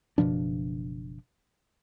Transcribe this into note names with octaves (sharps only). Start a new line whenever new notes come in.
F#1 B2 F3 D4